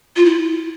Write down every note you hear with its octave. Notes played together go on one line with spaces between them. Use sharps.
F4
E4